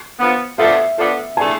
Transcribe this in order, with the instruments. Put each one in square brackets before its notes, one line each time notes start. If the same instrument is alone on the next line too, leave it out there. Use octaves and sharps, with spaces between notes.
[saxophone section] D3 F3 B3
[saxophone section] F3 B3 D4 A4 [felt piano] E5
[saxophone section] F3 B3 D4 A4
[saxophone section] C3 E3 A3 D4 G#4 [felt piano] G#5